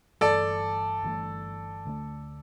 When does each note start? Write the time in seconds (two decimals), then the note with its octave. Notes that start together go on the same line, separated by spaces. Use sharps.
0.21 G1 G2 E3 A3 A4 D5
1.03 G1 G2 E3 A3
1.85 D2 D3 A3